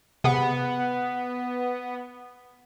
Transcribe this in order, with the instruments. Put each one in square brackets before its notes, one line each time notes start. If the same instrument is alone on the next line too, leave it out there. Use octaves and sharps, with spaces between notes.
[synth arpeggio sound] C3 G#4 F#5 [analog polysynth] B3